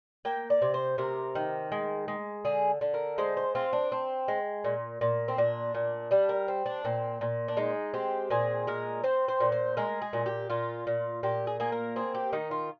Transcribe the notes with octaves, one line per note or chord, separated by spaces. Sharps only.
A#3 G5
D5
C3
C5
C3 A#4
D#3
G#3
G#3
D3 G#4
D3
A#4
G#3 C5
C5
C4 F4
D4
C4
G#3
A#2
A#2
C4
A#2 D4
A#2
G3 D4
A#4
C4
D4
A#2 C4
A#2
D4
G#3 D#4
C4 G4
A#2 G#4
G#3 A#4
C4 C5
C5
A#2
C5
G#3 A#4
G#4
A#2
G4
A#2 F4
A#2
A#2 G4
G#4
A#3 G#4
A#4
C4 G#4
G4
D#3 D#4
F4